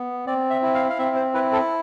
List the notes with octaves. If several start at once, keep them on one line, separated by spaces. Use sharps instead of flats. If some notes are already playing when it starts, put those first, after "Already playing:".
Already playing: B3
C4 D5
E5
E4
F5
F5
C4 E5
C5
E4 B4
A4